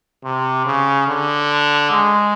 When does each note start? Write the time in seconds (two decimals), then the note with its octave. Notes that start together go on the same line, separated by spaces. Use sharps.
0.24 C3
0.66 C#3
1.08 D3
1.91 G#3